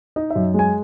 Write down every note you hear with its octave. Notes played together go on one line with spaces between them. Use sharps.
D#4 D#5
E5
F#2
G#3 G#5